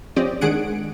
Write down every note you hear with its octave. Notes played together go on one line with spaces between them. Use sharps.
F3 C4 C#4 G4 D5 D#5
D#3 G#3 D4 G#4 F#5 D7